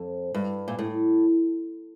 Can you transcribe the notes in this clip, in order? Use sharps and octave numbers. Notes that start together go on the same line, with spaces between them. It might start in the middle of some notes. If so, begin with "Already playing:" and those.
Already playing: F2
G2
A#2
A2